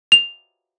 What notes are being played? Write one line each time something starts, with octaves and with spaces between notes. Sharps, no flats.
F7